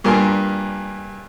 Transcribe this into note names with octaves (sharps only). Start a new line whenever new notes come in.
G2 A#2 A#4 G#5 C6